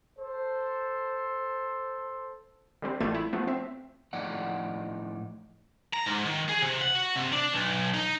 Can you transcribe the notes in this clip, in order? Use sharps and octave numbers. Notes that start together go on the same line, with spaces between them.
A4 C5
D3 G3 C4
A1 G3 A3 F4 G#6
E4
F3 A3 B3
C4 E5
A2 F3 D#4 D5 F#5
A#5
G#2
D#3
G#4
C3
F#5
F#4
C3
D4
B1
D#4